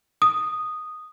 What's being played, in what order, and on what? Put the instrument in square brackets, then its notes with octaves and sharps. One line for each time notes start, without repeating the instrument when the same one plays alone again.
[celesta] D#6